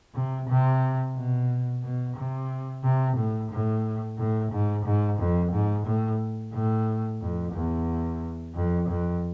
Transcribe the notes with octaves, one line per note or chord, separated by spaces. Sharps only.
C3
C3
B2
B2
C3
C3
A2
A2
A2
G#2
G#2
F2
G#2
A2
A2
F2
E2
F2
F2